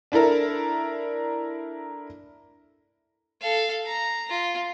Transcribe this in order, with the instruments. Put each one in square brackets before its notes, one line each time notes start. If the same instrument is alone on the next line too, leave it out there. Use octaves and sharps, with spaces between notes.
[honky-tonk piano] D4 E4 A4 A#4
[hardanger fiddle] A4 F5
A#5
F4